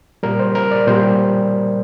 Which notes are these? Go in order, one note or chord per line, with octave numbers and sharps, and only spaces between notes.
A#2 G3 A#4
C5
A#4
D5
A#2 G3 C5